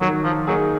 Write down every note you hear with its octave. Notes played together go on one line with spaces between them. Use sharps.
D#3 F#3
F3
F#3 A#3 D#4 G#4